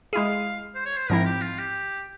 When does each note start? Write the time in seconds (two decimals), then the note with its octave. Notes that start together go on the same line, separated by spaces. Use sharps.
0.13 G#3 E4 G#4 F5
0.75 C5
0.85 C#5
0.97 C5
1.09 G#2 F3 C4 E4 A#4
1.25 G4
1.41 F4
1.58 G4